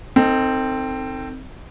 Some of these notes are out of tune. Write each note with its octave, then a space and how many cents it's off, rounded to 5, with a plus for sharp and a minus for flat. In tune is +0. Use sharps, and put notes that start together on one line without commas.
C4 +0 D#4 +0 A4 +30